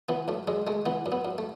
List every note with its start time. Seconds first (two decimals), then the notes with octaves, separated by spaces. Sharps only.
0.09 E3 B3
0.28 F#2 A3
0.48 F#2 G#3
0.67 G#3 A3
0.86 E3 B3
1.06 F#2
1.12 B3
1.25 F#2
1.38 A3